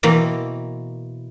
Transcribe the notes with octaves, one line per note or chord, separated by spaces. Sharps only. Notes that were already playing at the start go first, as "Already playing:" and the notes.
B2 E3 A#3 C4